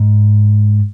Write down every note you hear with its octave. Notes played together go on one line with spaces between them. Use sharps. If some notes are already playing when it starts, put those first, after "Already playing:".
Already playing: G#2